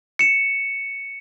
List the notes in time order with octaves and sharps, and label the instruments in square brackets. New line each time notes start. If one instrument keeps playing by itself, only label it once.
[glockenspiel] C#7 E7